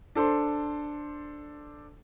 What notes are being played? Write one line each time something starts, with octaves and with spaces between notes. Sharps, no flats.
D4 A4 C5 C6